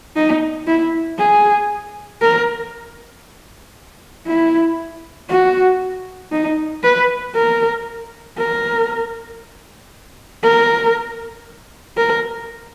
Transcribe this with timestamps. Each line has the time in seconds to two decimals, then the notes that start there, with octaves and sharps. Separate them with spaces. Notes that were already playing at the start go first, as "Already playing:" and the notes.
0.16 D#4
0.67 E4
1.18 G#4
2.22 A#4
4.27 E4
5.29 F#4
6.32 D#4
6.83 B4
7.35 A#4
8.37 A#4
10.43 A#4
11.97 A#4